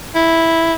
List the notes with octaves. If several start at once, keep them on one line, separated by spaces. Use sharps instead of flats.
E4